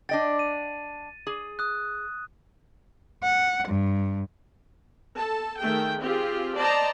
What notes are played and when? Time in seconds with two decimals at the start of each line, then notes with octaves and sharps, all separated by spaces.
0.09 D4 D#5 G5 A6
0.39 D#7
1.27 G#4
1.59 D#6 F#6
3.23 F#5
3.69 G2
5.16 A4 A5
5.60 D#3 A3 G#4 G5
6.01 C4 F4 G4 G#4
6.55 C5 D5 D#5 A5 A#5